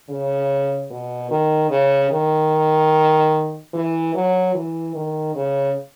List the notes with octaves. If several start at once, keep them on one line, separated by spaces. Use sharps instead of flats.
C#3
B2
D#3
C#3
D#3
E3
F#3
E3
D#3
C#3